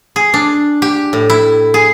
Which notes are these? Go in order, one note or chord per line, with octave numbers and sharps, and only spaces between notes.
G#4
D4
G4
A2
E4
G#4